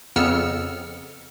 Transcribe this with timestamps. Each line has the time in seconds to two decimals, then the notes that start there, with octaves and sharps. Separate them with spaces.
0.16 F2 C#3 B3 E6 F6 C#7